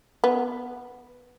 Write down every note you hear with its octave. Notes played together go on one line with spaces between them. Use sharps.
B3